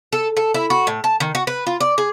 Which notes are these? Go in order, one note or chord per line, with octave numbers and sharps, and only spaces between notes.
A4
A4
E4
F#4
A2
A5
D#3
F#4
B4
F4
D5
G#4